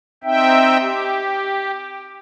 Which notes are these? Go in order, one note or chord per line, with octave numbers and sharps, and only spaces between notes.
C4 D#4 E5 G5
G4